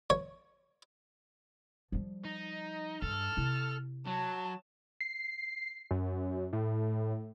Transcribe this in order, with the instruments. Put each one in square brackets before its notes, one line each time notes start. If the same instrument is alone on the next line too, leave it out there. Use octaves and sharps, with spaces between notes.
[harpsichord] C#5
[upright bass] F3 G3
[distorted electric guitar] D#4
[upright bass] G2 [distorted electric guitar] A4 [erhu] F6
[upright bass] C3 E4
[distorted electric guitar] F#3 [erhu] A5
[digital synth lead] C7
F#2
A2